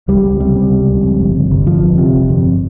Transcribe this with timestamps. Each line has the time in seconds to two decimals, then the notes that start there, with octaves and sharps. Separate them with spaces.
0.08 C#2 G3
0.24 C#2
0.40 C3 G3
0.56 C3
0.71 C#2
0.88 C#2
1.03 F2
1.19 G1
1.35 C3
1.51 G1
1.66 F2 F3
1.83 G1
1.98 C3
2.14 G1
2.29 F2